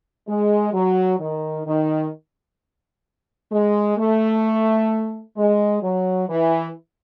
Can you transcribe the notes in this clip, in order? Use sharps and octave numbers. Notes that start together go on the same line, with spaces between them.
G#3
F#3
D#3
D#3
G#3
A3
G#3
F#3
E3